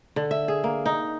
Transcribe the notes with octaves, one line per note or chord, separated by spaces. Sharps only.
D3
E5
G#4
A#3
D#4